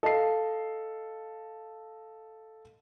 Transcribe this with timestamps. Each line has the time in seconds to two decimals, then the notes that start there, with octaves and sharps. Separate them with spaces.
0.03 A4 D#5 F5 C7